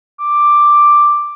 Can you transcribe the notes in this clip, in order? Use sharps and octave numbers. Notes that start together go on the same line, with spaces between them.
D6